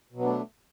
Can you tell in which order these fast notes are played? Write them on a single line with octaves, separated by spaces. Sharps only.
B2 F#3 B3 D4 A3